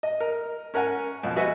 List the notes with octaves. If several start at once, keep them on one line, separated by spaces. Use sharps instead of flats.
D#5
A#4
C#4 A#4 F#5 G#5
F2 B2
F#4 B4 D#5 E5 F#5 G#5